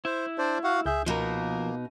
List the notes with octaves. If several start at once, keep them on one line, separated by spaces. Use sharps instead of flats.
E4 C5
D4 C5 D5
F#4 F5 F#5
C#2 G#4 E5 G6
B2 F3 A#3 D#4 A#4